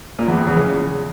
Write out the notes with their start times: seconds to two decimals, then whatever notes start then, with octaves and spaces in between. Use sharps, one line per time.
0.19 A#2
0.28 E2
0.37 F2
0.47 E2
0.56 C#3